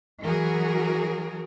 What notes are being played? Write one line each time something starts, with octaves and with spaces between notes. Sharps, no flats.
E3 F#3 F#4 G#4 A#4